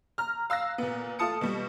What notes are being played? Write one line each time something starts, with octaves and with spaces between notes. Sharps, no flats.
A#5 F6
F5 E6 F#6 A#6
A#2 B3
A3 F4 A5 D#6 C#7
B2 G3